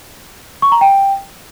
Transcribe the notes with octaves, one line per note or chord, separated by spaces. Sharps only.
C#6
A#5
G5